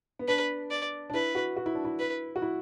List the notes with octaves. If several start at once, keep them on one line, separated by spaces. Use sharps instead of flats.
B3
D4 B4
D5
D4
E4 B4
F#4
F#4
E4
D4
E4
B4
F#4
E4